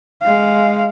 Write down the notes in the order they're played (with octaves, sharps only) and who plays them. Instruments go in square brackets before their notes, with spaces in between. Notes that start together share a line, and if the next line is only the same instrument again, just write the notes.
[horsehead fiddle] G#3 F5